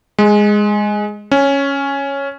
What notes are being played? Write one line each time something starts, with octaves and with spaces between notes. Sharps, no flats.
G#3
C#4